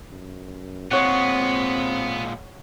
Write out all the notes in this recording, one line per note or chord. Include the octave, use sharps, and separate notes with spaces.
F#2
A#2 G#3 B3 C4 C#5 F#5